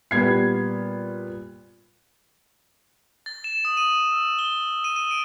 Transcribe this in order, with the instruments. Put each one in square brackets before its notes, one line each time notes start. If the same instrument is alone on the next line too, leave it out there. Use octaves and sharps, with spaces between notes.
[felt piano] A#2 G3 B3 G#6 C7
[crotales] A6
E7
D#6
D#7
E6
G7
D#7
D#7
D7